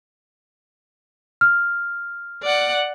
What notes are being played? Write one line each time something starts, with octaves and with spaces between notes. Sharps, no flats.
F6
D5 F#5